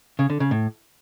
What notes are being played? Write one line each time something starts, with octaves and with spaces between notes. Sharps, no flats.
C#3
D3
C#3
A2